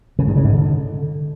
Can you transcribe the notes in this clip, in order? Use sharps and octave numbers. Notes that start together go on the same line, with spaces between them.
C#3
G2
C#3
G#2
D3